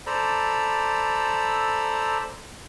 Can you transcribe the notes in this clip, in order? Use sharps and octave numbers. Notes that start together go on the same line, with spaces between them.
A4 C5 D5 A#5 B5 E6